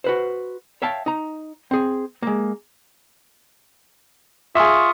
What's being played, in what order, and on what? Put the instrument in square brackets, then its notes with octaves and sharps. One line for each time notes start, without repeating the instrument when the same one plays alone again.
[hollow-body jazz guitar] F#4 B4 C5
C#5 E5 F5 G5 A5
D#4 A#5
C4 G#4
G#3 A#3
[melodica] F4 C#6 D#6 [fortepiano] G#4 E5